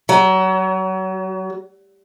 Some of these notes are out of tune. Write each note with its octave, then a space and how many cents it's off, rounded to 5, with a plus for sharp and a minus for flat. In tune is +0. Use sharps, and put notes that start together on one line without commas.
F#3 +30